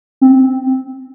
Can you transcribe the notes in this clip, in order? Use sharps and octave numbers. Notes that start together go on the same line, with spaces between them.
C4